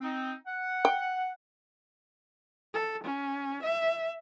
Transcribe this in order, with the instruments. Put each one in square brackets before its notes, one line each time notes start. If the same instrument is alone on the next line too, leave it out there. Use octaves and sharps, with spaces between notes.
[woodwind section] C4 D#4
F#5
[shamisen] G5
[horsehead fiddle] A4
C#4
E5